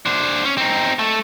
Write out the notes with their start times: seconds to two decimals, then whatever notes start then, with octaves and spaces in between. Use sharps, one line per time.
0.06 D4 C5
0.45 C#4
0.58 C4 D#4
0.99 A3